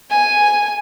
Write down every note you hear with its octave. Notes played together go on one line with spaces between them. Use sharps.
G#5